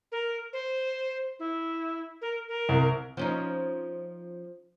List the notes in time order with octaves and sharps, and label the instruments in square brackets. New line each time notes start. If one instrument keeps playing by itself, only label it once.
[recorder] A#4
C5
E4
A#4
A#4
[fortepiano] C2
[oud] F3 C#4 D#4